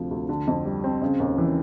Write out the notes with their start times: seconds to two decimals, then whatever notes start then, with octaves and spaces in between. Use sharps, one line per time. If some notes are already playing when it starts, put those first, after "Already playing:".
Already playing: D2 C3 F3
0.11 D2
0.29 D3
0.47 F2
0.65 G3
0.84 C4
1.02 C#3
1.20 D#2
1.38 E3